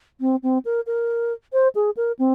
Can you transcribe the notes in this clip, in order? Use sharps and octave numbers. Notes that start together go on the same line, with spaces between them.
C4
C4
A#4
A#4
C5
G#4
A#4
C4